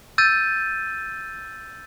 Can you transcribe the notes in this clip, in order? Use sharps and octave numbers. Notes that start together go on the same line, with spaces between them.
E6 G6 A6 D#7